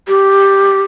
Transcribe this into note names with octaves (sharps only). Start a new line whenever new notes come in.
G4